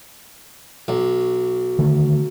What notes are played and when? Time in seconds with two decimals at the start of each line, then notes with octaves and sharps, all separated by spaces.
0.88 B1
1.79 D3 D#3 A3